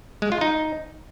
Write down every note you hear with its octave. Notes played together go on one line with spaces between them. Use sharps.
G#3
F4
D#4